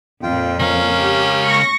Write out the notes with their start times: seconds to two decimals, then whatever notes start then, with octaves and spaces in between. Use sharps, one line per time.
0.23 F2 A#2 F4 G5
0.60 C#2 C#4 A#4 F5
0.98 G4
1.44 C#6 A#6